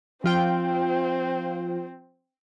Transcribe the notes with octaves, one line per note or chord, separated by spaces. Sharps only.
F3 C4 F4 C5 G5